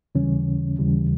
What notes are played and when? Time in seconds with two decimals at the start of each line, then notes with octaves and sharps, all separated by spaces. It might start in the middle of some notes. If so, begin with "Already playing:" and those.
0.15 D#2 C#3 E3 G3 C#4
0.79 D#2 C#3 E3 G3